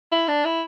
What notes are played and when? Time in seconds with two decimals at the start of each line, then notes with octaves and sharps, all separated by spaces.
0.12 E4
0.28 D4
0.45 E4